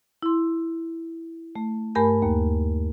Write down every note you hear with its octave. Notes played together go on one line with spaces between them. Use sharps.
E4 C6
A3
G2 A3 A#4 G#5 B5 G6
D#2 A#3